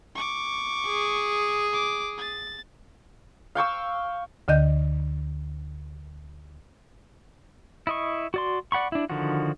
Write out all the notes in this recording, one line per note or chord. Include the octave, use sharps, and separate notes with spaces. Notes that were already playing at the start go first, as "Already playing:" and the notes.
C#6 D6
G#4
D6
A6
F5 G5 C#6 E6
D2 D3 D#5 G6
E4 D#5 C#6
F#4 D5 C6
D5 F#5 B5 C#6
D4 E4
D3 D#3 F3 F#4